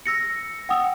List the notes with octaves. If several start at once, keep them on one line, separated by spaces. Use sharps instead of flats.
E6 A#6 C#7
F#5 G5 D#6 E6